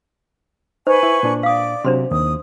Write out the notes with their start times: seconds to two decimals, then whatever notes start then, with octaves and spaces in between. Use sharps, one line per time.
0.87 D#4 B4 C5 G#5 C#6
1.03 E4
1.23 A#2 D4
1.43 D5 F5 D6 D#6
1.84 C3 F#3 D4 F#4 C5 C6
2.11 D#2 D#6